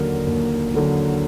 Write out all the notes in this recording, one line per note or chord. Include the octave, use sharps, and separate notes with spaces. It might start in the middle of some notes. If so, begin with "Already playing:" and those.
Already playing: D#2 D3 F#3 A#4
D#2
D3 F#3